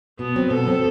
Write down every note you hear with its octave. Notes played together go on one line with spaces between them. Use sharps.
B2 B3
F#3 C4
B2 A4
F#3 C4